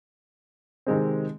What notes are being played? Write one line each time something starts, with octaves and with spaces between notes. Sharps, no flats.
C3 D#3 G#3 C4